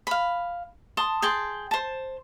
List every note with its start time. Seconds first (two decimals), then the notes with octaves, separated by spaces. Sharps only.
0.07 F5 B5
0.97 A5 C6 D#6
1.22 G#4 G5 A5 C6
1.71 C5 A5